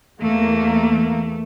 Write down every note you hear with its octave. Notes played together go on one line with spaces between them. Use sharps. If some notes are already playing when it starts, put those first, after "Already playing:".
E2 A3 A#3